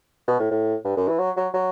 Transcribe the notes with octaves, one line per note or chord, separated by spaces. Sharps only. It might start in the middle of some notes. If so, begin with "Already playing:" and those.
B2
A2
A2
G2
F#2
E3
F#3
F#3
F#3